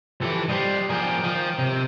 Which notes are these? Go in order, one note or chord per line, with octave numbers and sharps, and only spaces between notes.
E3 F3 E4 G4 A4
G3 G4 C5 D#5
F3 G#4 A#4 D5 G5
F3 A#4 D#5 G5
C3